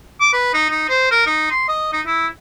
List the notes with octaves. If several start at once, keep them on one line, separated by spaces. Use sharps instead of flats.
D6
B4
D#4
D#4
C5
A#4
D#4
C6
D#5
D#4
E4